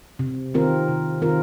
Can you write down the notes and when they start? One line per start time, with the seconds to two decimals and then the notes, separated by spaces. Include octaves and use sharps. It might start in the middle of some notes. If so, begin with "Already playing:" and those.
0.19 C3
0.54 D#3 C4 F4 A#4
0.88 C3
1.22 D#3 C4 F4 A#4